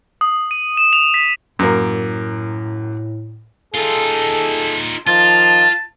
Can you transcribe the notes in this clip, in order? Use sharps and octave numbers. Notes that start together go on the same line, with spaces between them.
D#6
D#7
E7
F7
B6
F#2 A2 A#3
D#4 F4 G#4 A4
D#3 F3 F4 A5